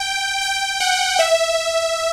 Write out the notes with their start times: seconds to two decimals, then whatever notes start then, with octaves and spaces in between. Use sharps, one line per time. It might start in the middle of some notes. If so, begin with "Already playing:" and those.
Already playing: G5
0.42 G5
0.80 F#5
1.19 E5